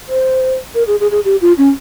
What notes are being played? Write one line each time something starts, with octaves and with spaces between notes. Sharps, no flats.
C5
A#4
G#4
G#4
G#4
G4
F4
C#4